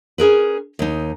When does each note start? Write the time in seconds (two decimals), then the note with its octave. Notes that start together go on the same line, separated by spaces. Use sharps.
0.18 C#4 G#4 A#4 B4
0.79 D#2 D#4